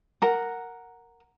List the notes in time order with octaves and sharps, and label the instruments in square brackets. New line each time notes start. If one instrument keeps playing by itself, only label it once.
[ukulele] A#4 F#5